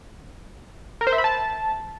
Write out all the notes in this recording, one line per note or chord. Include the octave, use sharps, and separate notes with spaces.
A#4
C5
E5
B5
A5